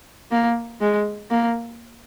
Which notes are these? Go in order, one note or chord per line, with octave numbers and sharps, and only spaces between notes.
A#3
G#3
A#3